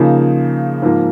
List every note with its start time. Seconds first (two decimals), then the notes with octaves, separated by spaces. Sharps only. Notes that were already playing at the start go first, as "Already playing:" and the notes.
Already playing: C#3 F3 A#3 D#4
0.82 G#2 F3 A#3